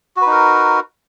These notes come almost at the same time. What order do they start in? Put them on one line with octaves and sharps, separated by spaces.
F#4 B4 D#4 A#4